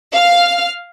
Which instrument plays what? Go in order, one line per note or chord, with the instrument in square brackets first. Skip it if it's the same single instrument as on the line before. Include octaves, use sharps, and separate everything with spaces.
[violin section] F5 F6